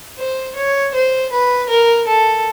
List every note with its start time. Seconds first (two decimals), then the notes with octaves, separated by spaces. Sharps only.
0.18 C5
0.56 C#5
0.94 C5
1.32 B4
1.69 A#4
2.07 A4